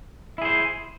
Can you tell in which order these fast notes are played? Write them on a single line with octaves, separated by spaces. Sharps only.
E4 G#4 C5